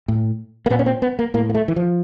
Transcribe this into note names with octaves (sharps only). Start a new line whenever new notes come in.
A2
A#3
A#2 B3
C#4
C4
B3
A#3
A2 A#3
A#3
A3
E3
F3